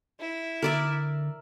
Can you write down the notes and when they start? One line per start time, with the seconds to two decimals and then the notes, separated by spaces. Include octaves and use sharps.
0.20 E4
0.62 D3 A#4 D5 E5